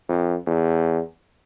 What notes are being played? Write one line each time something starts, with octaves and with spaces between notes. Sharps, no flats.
F2
E2